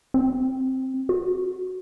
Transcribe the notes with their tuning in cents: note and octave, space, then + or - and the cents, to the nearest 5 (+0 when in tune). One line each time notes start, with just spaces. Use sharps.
C4 +5
F#4 +0